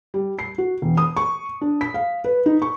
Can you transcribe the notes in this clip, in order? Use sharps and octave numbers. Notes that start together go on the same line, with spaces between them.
G3
C7
F#4
E1
D#6
C#6
D4
B6
F5
B4
D#4
C#6